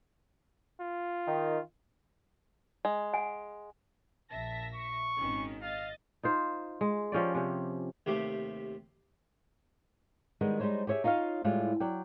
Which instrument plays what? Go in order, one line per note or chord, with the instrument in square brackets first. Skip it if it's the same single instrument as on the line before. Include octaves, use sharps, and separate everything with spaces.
[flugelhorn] F4
[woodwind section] D#3
[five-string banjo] G#3
[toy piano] F#5 G#5
[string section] A#1 E5 A#6 [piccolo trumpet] A5
[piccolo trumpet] C#6
[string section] G#1 D#3 C#4
[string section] D#5 A6 [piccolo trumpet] F5
[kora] D#4 F4 C5
G#3
F3 C#4 G4 D5
C3 C#4
[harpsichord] D#2 C3 A3 G4
[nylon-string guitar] D#3 G3 G#3 B3
G3 G#3 D#4 C5 C#5
G4 G#4 C#5 D#5 E5
D#4 F4 C#5 D#5 F5
A2 G3 G#3 F4
F#3 D5 G5